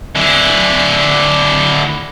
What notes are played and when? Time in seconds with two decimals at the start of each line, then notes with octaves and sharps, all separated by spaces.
0.16 D3 E4